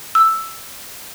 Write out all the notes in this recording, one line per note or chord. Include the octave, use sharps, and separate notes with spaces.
E6